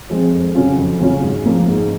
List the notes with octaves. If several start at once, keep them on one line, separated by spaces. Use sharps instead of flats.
F3 G#3 C4
F2
C#3 F#3 C#4 F4
F2
C#3 F#3 C#4 F4
G#2
F3 A#3
G#2